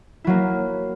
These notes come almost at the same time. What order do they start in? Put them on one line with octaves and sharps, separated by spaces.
E4 F#3 A#3